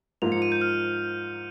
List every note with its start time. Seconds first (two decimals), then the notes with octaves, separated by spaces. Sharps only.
0.22 G#2 F3 A#3 F4 F7
0.32 C#7
0.42 D#7
0.52 G6
0.61 F6